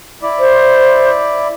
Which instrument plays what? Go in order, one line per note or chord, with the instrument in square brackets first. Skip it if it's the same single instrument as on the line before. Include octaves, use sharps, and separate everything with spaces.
[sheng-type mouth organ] E4 D5
[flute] C5